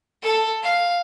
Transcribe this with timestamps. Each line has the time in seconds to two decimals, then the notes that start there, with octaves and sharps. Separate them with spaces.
0.22 A4
0.63 F5